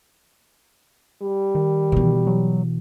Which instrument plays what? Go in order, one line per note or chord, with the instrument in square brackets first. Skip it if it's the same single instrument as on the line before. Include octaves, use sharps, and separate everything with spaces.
[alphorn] G3
[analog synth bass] D#3
[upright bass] B2 E3
[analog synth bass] F#3